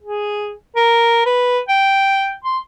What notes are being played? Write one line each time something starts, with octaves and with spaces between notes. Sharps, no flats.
G#4
A#4
B4
G5
C6